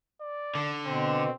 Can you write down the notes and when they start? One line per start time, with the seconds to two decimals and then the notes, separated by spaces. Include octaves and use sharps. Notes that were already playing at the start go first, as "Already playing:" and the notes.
0.21 D5
0.55 D3
0.86 B2 C4